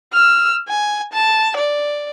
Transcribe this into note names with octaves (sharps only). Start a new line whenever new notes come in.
E6 F6
G#5
A5
D5